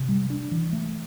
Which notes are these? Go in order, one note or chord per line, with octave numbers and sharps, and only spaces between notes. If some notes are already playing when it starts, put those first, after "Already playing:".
Already playing: C3
G3
D4
E3
A3